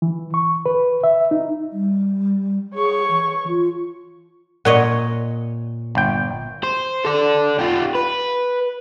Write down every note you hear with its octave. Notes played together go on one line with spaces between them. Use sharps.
E3
C#6
B4
E5
D#4
G3
G#4 C#5 C#6
E3
F4
A#2 C#5 D#5 F#5
G1 G5
C5
A4 D5
F4 G4
B4